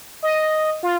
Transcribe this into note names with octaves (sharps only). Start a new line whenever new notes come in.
D#5
F4